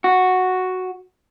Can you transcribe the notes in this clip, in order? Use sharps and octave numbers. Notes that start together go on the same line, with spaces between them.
F#4